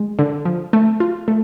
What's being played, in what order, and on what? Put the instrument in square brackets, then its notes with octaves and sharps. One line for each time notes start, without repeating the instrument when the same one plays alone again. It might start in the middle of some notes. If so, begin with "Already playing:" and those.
Already playing: [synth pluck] G#3
D3
F3
A3
F4
A3